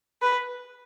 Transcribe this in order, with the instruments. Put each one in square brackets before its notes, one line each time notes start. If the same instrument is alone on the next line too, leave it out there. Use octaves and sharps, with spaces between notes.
[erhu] B4